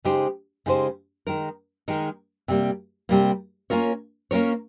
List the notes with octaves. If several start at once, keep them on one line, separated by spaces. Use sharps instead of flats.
C#3 G#3 D#4 G4 C5
C#3 G#3 D#4 G4 C5
D#3 G#3 D#4 A#4
D#3 G#3 D#4 A#4
C3 G3 A#3
C3 G3 A#3
A#3 C#4 F4 A#4 C#5
A#3 C#4 F4 A#4 C#5